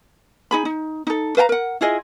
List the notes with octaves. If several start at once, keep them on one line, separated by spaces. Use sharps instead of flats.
D#4 G#4 B5
D#4
D#4 A4
B4 F5 G5 A#5
A#4 F#5
E4 F4 G#4 D#5